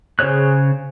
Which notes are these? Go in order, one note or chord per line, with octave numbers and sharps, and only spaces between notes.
C#3 G#4 C5 C#5 F#6